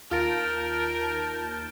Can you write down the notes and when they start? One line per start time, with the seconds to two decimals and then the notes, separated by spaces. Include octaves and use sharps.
0.11 D#2 F4 A#4 A5 F6 G6 A6 D7